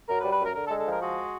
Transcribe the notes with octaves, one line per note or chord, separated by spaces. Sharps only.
F#2 A#4
B4
G3
B4
F#2 A#4
D3 A#4
A4
G#3
A4
F3 A#4
G#3 F#4